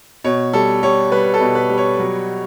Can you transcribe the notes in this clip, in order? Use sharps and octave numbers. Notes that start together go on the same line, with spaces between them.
B2 C#5
G3 A4
G3 C#5
G3 B4
A4
B2
B4
G3
C#5
F#3